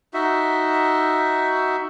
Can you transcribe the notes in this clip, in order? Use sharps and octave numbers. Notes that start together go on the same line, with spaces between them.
D#4 F#4 E5